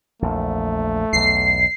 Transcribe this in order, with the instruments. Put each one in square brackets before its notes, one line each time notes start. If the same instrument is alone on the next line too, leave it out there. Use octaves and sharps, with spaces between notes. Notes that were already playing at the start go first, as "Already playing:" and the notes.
[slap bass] A#1 E2 [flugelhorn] A3
[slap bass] B1 E2 [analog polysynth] C7